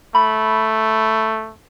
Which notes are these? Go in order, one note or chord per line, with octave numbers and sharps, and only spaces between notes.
A3 B5